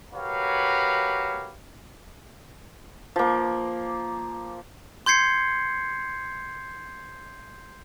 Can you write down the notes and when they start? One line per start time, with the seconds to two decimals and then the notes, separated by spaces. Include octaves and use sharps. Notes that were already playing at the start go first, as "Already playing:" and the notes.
0.14 F#4 G4 A#4 B4 C#5 F5
3.16 F3 A#3
5.06 C6 G6 G#6 C7 C#7